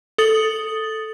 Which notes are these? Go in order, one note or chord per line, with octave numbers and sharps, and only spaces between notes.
A4 D#6 A6 F#7